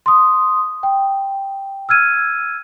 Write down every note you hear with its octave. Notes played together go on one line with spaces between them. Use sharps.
C6 D#6
G5
E6 F6 G#6 D#7